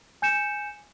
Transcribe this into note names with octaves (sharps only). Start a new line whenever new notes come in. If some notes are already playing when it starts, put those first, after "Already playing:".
G#5 G6 C#7 E7